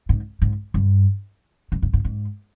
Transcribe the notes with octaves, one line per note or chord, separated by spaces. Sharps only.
G#2
G#2
G2
G2
G2
G#2
G#2